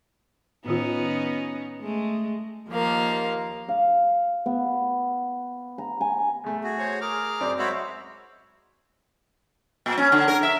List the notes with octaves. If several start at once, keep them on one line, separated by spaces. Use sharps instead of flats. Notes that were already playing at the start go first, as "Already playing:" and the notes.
A2 D#3 B3 C#4 D#4 F4
G#3 A3
D#2 F3 A#3 F5
F5
B3
A#5
G#5
E2 A3
F#4 G#4
C5 C#5
G#4 A#4 D6 F6
F#2 C4 D5
G#3 F#4 C5 C#5 E5 B5
A#2
C#4
D3
A#4
E5